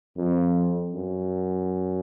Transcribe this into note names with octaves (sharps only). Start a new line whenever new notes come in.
F2
F#2